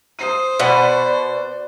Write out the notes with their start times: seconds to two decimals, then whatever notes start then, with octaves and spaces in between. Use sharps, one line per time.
0.19 C5 D#6 C7 D#7
0.59 B2 F#4 B4 D5 F#5 B5